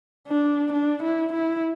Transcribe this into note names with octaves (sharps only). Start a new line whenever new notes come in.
D4
D4
E4
E4